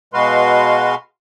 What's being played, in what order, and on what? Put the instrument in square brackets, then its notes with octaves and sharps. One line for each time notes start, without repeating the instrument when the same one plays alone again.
[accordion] B2 G#3 F#4 B4 F5 C6